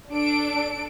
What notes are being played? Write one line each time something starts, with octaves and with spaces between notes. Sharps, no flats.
D4 A4 D7